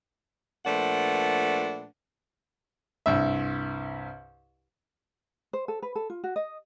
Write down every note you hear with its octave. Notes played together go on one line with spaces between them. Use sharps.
A#2 F3 A3 D4 B4 F#5
C2 G2 E5
C5
A4
B4
A4
F4
F#4
D#5